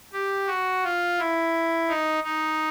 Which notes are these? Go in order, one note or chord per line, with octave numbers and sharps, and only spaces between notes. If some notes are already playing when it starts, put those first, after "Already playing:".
G4
F#4
F4
E4
D#4
D#4